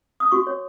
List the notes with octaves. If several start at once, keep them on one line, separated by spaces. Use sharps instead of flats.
D#6
F#4 C#6
C#5